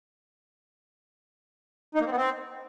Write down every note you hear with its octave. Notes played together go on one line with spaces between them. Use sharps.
D#4
A#3
C4
B3
C4